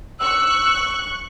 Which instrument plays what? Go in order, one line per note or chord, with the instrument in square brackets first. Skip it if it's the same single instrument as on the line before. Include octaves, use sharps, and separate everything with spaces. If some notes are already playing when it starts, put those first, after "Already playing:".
[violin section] C#6 F#6 [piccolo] E6